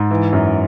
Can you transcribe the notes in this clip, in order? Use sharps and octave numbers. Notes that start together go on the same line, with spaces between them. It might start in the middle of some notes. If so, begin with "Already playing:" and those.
Already playing: G#2
E3
F#2